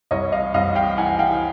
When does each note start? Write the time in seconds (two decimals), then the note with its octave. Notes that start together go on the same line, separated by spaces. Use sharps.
0.11 C2 C#5 D#5
0.32 D#5 F5
0.54 C2 D#5 F5
0.76 F5 G5
0.98 E3 F#5 G#5
1.19 F5 G5